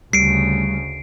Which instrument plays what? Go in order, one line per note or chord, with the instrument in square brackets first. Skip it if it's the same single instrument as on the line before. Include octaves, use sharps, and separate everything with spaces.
[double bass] D2 C#3 [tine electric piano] G3 [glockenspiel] C7 D7